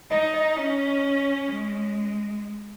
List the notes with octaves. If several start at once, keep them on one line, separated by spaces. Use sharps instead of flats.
D#4 D#5
D#5
C#4
G#3